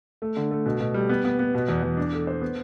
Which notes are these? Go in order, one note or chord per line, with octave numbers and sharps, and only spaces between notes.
A3
D3
A3
B2
B2
G3
B3
B3
B3
B2
E2
E2
D4
A4
C5
B3